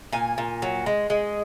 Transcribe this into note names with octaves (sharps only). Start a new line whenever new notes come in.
A#2 G#5
A#2
F#3
G#3
G#3